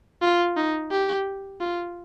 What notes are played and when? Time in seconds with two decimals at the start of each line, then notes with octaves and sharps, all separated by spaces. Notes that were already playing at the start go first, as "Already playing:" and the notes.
0.22 F4
0.57 D#4
0.91 G4
1.61 F4